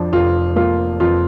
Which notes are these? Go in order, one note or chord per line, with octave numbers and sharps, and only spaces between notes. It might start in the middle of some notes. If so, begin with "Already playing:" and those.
Already playing: F2 F3 D4
F1 F4
A#3 F4
F2 F4